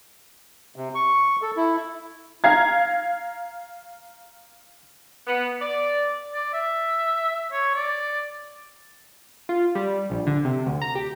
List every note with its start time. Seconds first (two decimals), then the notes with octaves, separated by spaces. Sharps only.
0.76 C3
0.95 C#6
1.42 A4
1.57 E4
2.44 F5 A#5 G#6
5.27 B3
5.61 D5
6.33 D5
6.53 E5
7.52 C#5
7.75 D5
9.49 F4
9.75 G3
10.10 A#1
10.26 D3
10.45 C3
10.66 D2
10.82 A#5
10.95 G4